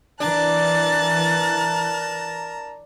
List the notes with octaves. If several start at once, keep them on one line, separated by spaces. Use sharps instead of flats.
E3 D4 A#4 A5 A#5 F#6 A6